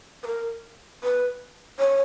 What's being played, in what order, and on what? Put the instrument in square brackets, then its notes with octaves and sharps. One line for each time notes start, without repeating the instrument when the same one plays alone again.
[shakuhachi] B4
A#4
B4
C#5